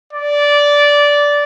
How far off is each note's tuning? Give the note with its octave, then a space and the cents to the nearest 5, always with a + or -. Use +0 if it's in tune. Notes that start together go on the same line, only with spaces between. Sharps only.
D5 -15